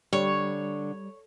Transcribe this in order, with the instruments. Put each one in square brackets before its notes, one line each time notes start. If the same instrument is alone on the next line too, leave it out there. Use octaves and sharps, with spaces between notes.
[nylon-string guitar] D3 [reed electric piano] G3 [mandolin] C#5